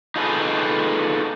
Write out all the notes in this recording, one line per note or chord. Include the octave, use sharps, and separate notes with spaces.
D#4 F4 G#4 A4 B4